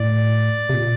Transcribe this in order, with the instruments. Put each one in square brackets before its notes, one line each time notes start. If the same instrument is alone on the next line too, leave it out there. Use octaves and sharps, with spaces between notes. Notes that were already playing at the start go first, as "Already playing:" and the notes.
Already playing: [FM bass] A2 [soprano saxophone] D5
[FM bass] C3
A#2